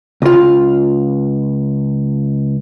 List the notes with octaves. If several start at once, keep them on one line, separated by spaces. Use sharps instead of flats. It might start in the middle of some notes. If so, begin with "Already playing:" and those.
C#2 F4